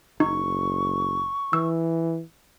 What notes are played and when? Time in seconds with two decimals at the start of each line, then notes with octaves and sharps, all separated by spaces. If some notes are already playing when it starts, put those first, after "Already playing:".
0.20 F#1 D#4 C#6
1.53 E3 E6